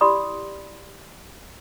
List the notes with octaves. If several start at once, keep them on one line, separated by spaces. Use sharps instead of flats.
E4 G4 D5 B5 C6 D#6